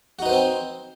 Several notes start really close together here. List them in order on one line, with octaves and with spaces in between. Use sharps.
F#4 D#4 B4 C5 C4